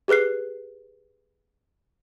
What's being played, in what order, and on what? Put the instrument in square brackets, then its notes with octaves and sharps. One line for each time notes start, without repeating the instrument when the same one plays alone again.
[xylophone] G4 G#4 B4 F#6 C7